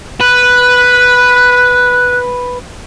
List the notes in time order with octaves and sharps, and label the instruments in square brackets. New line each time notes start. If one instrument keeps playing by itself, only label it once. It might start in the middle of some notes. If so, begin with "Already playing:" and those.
[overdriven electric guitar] B4 [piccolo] F#6